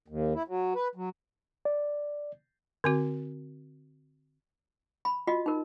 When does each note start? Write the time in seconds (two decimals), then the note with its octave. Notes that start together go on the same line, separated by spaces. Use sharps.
0.08 D#2
0.35 E4
0.48 F#3
0.75 B4
0.95 F#3
1.65 D5
2.84 D3 C4 F#4
5.05 B5
5.27 F4 F#4 D#5
5.46 D#4 A#4